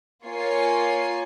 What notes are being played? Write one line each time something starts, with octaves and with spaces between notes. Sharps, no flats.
A#3 F4 C#5 G#5 C7